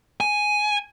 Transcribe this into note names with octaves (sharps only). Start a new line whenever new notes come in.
G#5